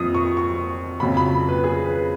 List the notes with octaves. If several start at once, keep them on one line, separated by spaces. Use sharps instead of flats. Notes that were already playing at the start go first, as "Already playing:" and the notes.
Already playing: F2 F3 D#6
C#6
C#6
F2 C#3 F#3 B5
B5
B4
G#4
B4